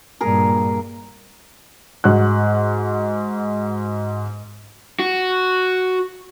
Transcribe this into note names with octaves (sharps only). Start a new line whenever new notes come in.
G2 A#2 G#4 A#4
G#2 F#4 F#6
F#4